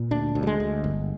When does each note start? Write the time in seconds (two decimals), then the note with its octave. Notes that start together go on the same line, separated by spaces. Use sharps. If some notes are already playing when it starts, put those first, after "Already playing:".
Already playing: A#2
0.11 D2 D4
0.35 D2
0.43 G3
0.47 G#3
0.60 D2
0.84 G1